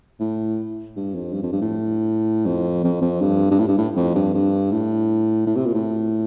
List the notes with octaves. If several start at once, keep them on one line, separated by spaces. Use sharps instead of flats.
A2
G2
F2
G2
F2
G2
A2
F2
F2
F2
G2
G2
A2
G2
A2
F2
G2
G2
A2
A2
C3
A#2
A2